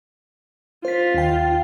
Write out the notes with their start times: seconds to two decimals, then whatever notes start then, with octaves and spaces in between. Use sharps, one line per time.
0.85 F4 C5 B6
1.14 D#2 G5